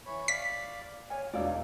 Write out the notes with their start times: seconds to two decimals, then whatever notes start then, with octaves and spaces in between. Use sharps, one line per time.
0.06 E3 C#5 B5
0.28 D5 F5 B6
1.10 C#5 G#5 F6
1.33 E1 D4 D#4 C#5 D5 F5 E6